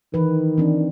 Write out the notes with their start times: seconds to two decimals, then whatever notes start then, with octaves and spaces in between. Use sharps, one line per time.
0.14 D#3 E3 B4
0.58 E3 C4 D4